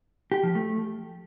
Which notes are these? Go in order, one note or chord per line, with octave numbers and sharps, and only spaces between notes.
G4
F3
A3